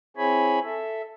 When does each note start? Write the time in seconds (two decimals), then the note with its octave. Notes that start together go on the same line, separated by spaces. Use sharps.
0.17 C4 E4 G#4 C#5 G#5 B5
0.63 A4 E5